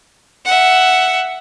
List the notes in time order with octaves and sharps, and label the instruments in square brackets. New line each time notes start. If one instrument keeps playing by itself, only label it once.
[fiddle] E5 F#5